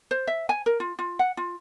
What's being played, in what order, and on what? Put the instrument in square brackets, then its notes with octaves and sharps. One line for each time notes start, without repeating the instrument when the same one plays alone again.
[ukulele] C5
E5
G#5
A#4
F4
F4
F#5
F4